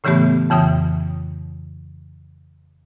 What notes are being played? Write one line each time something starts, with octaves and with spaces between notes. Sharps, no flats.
A2 C#3 E3 A3 B3 G4
F2 C#3 E3 G5 D#6